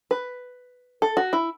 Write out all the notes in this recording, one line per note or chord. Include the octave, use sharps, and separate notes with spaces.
B4
A4
F#4
E4